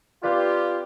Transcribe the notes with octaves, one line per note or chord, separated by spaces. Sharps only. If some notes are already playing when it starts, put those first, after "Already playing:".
C4 F4 G4 B4 D5